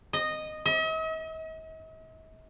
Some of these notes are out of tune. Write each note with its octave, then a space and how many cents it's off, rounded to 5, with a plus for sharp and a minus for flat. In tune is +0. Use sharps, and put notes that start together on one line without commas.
D#5 -10
D#5 +45